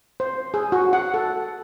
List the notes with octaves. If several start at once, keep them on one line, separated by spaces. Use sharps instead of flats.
C5
G#4
F#4
F#5
A4